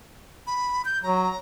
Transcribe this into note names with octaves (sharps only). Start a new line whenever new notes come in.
B5
G6
F#3 A#5